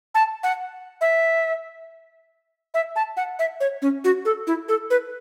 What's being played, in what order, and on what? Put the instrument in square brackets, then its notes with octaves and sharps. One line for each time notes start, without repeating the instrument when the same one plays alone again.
[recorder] A5
F#5
E5
E5
A5
F#5
E5
C#5
C#4
F#4
A4
E4
A4
B4